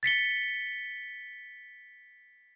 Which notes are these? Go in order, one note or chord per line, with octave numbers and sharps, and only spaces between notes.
A6 B6 C#7 G7